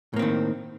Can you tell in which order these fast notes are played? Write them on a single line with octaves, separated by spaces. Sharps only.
A2 A#3 C4 D#3